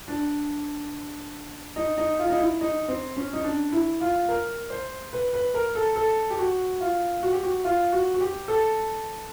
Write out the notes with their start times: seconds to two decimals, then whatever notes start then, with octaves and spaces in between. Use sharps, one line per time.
0.08 D4
1.76 D#4
1.98 D#4
2.19 F4
2.30 D#4
2.40 E4
2.61 D#4
2.88 C4
3.17 C#4
3.33 D#4
3.44 D4
3.72 E4
4.01 F4
4.29 A#4
4.70 C5
5.13 B4
5.33 B4
5.54 A#4
5.75 A4
5.96 A4
6.30 G4
6.39 F#4
6.81 F4
7.23 F#4
7.33 G4
7.43 F#4
7.64 F4
7.92 F#4
8.14 F#4
8.21 G4
8.48 A4